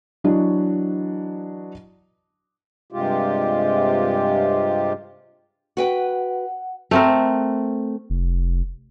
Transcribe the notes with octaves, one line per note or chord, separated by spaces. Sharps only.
E3 F#3 D4 F#4 D#5
G2 C3 G#3 F4 G4
F#4 B4 F#5 G5
A3 C4 A#4
F1